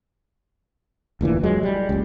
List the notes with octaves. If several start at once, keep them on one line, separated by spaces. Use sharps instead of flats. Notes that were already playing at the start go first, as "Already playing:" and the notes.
F1 D2 A#2 E3
F#3 G#3
G3
F#1 C#2